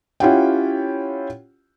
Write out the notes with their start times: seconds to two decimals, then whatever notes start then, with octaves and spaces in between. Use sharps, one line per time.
0.20 C#4 E4 F4 G4 F#5 G5